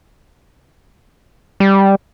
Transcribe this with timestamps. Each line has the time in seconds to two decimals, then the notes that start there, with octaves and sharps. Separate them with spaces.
1.60 G3